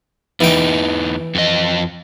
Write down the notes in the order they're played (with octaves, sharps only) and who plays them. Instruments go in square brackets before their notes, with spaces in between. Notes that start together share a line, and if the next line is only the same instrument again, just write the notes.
[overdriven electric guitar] E2 D#4 [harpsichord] E3 G5
[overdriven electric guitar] F2 D#5